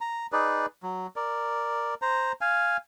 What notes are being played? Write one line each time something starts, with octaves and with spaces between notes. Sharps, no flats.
A#5
D#4 G#4 B4 D5
F#3
A#4 D5
C5 A#5
F5 G#5